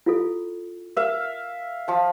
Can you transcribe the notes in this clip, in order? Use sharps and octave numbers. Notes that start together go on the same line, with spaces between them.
E4 F4 A4
A#4 E5 F5
F3 A5